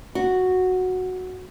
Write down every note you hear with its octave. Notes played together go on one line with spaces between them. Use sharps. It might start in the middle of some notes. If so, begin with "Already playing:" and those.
F#4